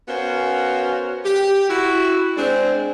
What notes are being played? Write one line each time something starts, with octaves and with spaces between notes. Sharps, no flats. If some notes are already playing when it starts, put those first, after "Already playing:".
B3 C#4 F#4 A#4 C5 F5
G4
E4 F#4
G#3 C4 D4